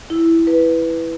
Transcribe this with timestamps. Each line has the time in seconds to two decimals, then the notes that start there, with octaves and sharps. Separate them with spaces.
0.10 E4
0.47 B4